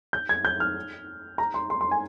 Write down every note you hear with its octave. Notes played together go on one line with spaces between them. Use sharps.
G6
G#6
G6
F6
A#5
C6
C6
C6
G#5